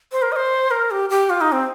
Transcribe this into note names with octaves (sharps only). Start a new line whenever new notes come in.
C5
A#4
D#5
C5
A#4
G4
G4
F4
D#4
C4